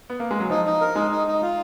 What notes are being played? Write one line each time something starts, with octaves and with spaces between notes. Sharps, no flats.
B3
A#3
G#3
F#3
F3 D#4
D#4
A#4
G#3 D#4
D#4
D#4
F4